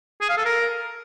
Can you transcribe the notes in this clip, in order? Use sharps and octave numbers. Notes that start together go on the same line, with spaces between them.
G#4
F5
A4
A#4